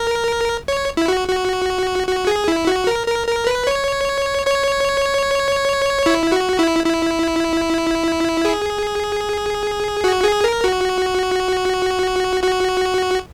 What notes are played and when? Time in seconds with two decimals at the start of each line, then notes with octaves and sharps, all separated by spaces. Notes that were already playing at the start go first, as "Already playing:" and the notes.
Already playing: A#4
0.68 C#5
0.97 E4
1.08 F#4
1.28 F#4
2.08 F#4
2.27 G#4
2.48 E4
2.67 F#4
2.87 A#4
3.07 A#4
3.27 A#4
3.47 B4
3.67 C#5
4.47 C#5
6.06 E4
6.32 F#4
6.59 E4
6.85 E4
8.45 G#4
10.04 F#4
10.24 G#4
10.44 A#4
10.64 F#4
12.43 F#4